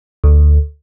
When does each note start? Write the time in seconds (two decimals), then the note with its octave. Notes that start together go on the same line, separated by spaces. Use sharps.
0.24 D2